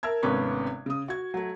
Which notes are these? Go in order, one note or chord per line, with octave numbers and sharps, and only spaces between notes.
A#4 E5 A5 G#6
G#1 C3 A3 B3 C#4
C#3 D#6
F#4 G#6
F#3 A3